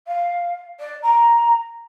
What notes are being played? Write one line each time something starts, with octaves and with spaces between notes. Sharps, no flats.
F5
D5
A#5